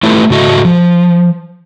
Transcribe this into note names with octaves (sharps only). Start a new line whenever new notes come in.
A3 E4 F4 G4 A4 B4
G#2 C#3 F#4 A4 D#5 E5
F3